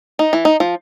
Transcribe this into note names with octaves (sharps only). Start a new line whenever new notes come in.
D#4
E3
D#4
F3